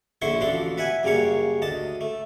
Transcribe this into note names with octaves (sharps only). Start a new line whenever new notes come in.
A#1 D3 E4 C5 C6 C#6
A1 D2 F3 D4 A4 C6
B4 E5 F#5 G#5
F#2 C#3 G3 A#3 C#5 C#6
D2 D#5 A5 D#6
A3